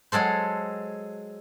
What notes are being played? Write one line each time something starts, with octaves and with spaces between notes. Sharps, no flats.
F#3 G#3 A4 C5